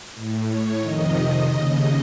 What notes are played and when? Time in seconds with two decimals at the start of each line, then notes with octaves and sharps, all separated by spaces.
0.15 A2
0.47 C#5
0.81 F2 C3 D#3 D#5
1.47 D#2 C#3